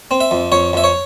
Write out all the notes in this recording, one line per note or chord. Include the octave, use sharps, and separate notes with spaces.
C4
E5
F2
F2 C#5
F2 E5
C#5